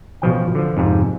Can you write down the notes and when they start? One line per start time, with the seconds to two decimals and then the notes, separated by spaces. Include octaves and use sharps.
0.22 A1 B2 F3 G5
0.55 D3 F3
0.77 F2 G#2 C3